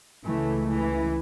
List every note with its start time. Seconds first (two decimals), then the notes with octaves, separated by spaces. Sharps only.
0.25 C#2 C#3 E3 A3
0.68 E3